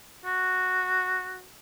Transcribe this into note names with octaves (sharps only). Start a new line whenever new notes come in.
F#4